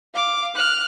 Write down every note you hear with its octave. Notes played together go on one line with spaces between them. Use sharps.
F5 D6
F6 F#6